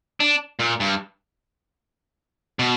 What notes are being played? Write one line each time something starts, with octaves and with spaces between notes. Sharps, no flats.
D4
A#2
G2
B2